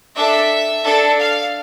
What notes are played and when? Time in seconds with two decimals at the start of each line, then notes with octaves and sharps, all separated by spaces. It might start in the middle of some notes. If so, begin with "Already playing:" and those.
0.17 D4 A4 E5
0.85 D4 A4
1.19 F5